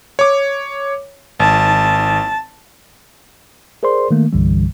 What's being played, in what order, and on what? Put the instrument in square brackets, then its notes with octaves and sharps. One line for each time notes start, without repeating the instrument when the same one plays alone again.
[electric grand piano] C#5 D6
[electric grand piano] G#1 [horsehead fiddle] A5
[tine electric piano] G#4 A#4 C5 D5 C6
D#3 A3 A#3
C2 G2 D3 E3 G3